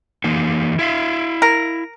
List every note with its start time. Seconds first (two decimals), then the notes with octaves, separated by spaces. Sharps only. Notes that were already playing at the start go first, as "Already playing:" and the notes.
0.24 E3 A#3 D#4
0.79 E4 E5 F5
1.42 A#4